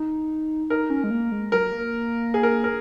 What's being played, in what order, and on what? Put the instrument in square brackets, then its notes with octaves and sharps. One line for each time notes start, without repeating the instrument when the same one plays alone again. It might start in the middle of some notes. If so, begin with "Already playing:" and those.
Already playing: [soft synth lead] D#4
[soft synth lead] D#4 [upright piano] A#4
[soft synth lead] C#4
G#3
A#3
G#3
[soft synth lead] F#3 [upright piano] A#4
[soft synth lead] A#3
[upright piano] G#4
A#4
A#4